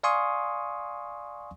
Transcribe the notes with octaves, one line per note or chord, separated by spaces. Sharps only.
D5 F5 G#5 C6 C#6 D#6